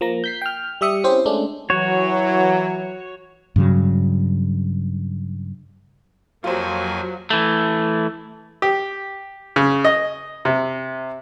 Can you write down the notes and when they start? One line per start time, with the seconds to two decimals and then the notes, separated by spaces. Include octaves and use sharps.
0.01 F3 A#3 A#5
0.24 G6 B6 C7
0.42 G5 F6
0.81 G3 G4 E5 D#6 C#7
1.04 C4 C#4 E4 G4 C5
1.26 G#3 A3 C#4 D4
1.70 E3 F#3 F#4 C#5
3.56 G2 C#3 F#3
6.44 F2 F#3 A#3 F4 G4 C5 G#5
7.30 E3 A3
8.62 G4
9.56 C#3
9.85 D#5
10.45 C3